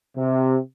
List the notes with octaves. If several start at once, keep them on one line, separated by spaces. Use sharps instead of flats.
C3